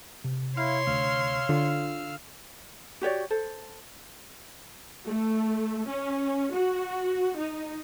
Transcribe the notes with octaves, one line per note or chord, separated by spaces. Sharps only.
C3
E4 C#5 F5 C6
D2 F5 E6 F6
D3 F4
F#4 G4 C#5 D5
A4 C5
A3
C#4
F#4
D#4